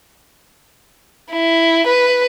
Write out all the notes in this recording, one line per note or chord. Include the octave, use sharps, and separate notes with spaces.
E4
B4